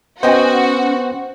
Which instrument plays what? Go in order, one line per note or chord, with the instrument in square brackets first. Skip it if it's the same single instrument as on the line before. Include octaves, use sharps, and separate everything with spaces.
[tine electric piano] B3 C5 [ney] C#4 [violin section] F#4 [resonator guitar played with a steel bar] D#5 G5 G#5